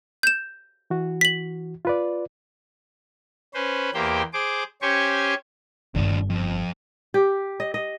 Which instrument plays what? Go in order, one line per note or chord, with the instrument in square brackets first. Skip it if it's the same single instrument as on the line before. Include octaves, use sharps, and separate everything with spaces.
[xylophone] G6 E7
[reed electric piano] E3 F#4
[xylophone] B6 F#7
[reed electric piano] F4 B4 D5
[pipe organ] C#4 B4 C5
E2 A#3 G4 C5 G5
G#4 C5 D6
C#4 G4 C5 G#5 C#6
[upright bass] G1 B3 [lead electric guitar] D#2 D4
[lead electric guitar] F2
[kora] G4
D#5
D#5